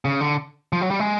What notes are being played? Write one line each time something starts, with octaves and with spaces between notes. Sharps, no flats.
C#3
D3
F3
F#3
G3
G#3